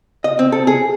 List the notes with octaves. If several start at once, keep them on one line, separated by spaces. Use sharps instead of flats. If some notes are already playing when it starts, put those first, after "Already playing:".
D#5
C4
A4
G#4